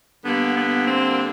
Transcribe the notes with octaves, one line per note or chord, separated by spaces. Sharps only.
D3 G3 A#3 B3
B3
C4